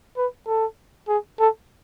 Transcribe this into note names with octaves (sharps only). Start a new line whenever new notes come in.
B4
A4
G#4
A4